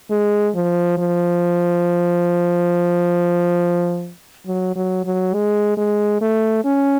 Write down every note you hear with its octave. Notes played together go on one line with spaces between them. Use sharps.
G#3
F3
F3
F#3
F#3
F#3
G#3
G#3
A3
C#4